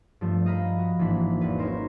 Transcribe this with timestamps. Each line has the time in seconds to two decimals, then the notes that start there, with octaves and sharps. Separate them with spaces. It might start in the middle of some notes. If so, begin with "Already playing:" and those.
0.21 G2 F3 A3
0.46 D#5 F5 A#5 B5
0.78 F#4
0.99 G#1 E3 A#3 D4 B5 B6
1.41 E1 B4
1.59 C#4 D#4 A#4 C5